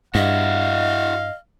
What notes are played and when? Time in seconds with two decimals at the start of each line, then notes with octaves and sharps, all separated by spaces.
0.15 G2 E4 F#4 D#5 F5